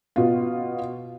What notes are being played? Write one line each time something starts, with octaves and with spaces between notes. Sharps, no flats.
B2 F4